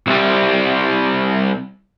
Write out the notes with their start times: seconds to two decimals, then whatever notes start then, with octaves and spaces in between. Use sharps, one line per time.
0.07 C2 G3